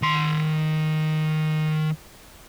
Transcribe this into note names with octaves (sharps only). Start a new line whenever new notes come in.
D#3 C6